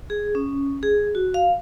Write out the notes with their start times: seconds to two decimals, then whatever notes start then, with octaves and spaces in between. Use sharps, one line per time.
0.10 G#4
0.35 C#4
0.83 G#4
1.15 F#4
1.34 F5